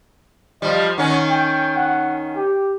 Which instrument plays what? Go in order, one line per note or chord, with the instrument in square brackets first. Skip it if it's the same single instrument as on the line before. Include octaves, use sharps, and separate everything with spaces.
[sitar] F3 G3 [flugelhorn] D#5
[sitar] D#3 C#4 [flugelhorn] F#5
[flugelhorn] G5
F#5
G4